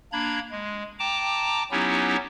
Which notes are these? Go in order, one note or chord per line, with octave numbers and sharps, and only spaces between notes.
A#3 D4 A#5 B5 G#6
G#3
G5 A5 A#5 D6
F#3 B3 C#4 D#4 E4 G4